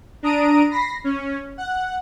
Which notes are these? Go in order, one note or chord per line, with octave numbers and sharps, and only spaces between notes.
D4 A#5 D#6 D7 D#7
B5 A#6 C7
C#4
F#5